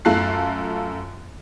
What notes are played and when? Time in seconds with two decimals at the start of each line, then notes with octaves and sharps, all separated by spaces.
0.05 F#2 A3 F4 A5 F#6 C7